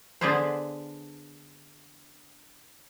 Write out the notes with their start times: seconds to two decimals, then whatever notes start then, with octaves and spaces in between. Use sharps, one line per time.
0.21 D3 B3 D4 G#4 B4 C5